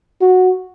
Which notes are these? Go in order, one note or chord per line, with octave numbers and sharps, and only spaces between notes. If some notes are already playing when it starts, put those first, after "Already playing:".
F#4